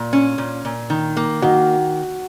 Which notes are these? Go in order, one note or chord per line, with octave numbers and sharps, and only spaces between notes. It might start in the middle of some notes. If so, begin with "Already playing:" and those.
Already playing: A#2
C#4
A#2
A#2
D#3
A#3
D#3 F#4